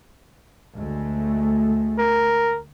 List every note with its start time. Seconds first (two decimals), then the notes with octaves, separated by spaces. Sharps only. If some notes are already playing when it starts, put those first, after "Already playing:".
0.76 D2 G#3 A3
1.98 A#4